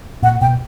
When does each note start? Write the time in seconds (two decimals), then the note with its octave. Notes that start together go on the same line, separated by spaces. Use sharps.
0.22 A#2 F#5
0.41 B2 G5